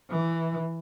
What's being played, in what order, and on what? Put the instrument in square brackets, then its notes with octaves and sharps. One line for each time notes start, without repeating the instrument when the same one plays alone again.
[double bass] E3